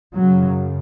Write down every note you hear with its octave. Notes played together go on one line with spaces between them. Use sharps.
F#2 C#3 F#3